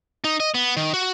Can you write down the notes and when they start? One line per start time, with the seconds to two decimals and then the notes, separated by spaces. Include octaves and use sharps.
0.24 D#4
0.40 D#5
0.54 B3
0.77 D#3
0.94 F#4